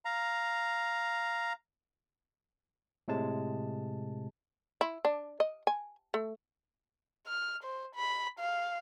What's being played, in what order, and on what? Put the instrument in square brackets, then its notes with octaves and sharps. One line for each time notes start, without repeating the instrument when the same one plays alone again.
[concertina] F5 A#5
[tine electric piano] A2 C3 G#3 A5
[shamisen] E4
D4
D#5
G#5
A3
[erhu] F6
C5
B5
F5